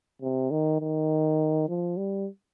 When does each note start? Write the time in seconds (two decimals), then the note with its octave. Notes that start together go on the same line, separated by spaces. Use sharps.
0.22 C3
0.51 D#3
0.81 D#3
1.68 F3
1.97 G3